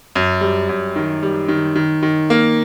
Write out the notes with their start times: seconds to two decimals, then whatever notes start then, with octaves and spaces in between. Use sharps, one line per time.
0.15 F#2
0.41 G3
0.69 F#2
0.96 D#3
1.23 G3
1.48 D#3
1.76 D#3
2.03 D#3
2.30 A#3